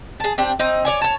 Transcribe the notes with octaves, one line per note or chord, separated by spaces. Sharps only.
G#4 A5
C4 D4 G4
C4 D#4
C#5 D5 G#5
C#5 A5